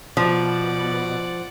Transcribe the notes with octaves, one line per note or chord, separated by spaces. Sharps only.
B2 F3 D5 F#5